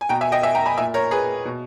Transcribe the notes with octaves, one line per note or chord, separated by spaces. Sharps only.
G#5
B2 G5 A#5
E5 G#5
D#5 G5
E5 G#5
G5 A#5
G#5 B5
A#2 E5 G#5
A#4 C#5
G#4 B4
B2